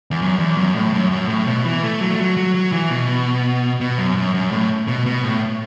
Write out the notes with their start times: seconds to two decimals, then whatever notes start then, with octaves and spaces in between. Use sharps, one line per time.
0.11 E2
0.22 F#2
0.39 E2
0.58 F#2
0.75 A2
0.93 F#2
1.11 F#2
1.29 A2
1.47 B2
1.65 E3
1.83 A3
2.01 F#3
2.11 A3
2.19 F#3
2.37 F#3
2.55 F#3
2.72 E3
2.91 B2
3.81 B2
3.98 F#2
4.17 F#2
4.34 F#2
4.52 A2
4.88 B2
5.06 B2
5.24 A2